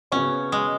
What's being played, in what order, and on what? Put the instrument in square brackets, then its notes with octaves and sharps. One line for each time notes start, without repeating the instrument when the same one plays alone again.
[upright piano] C#3 F#3 B3 F#4 C#5 [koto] C#4
[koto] G#3